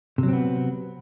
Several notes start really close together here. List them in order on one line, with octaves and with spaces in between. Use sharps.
C3 F#3 C4 B3